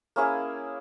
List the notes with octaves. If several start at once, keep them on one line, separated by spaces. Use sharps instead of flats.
A#3 C#4 E4 G#4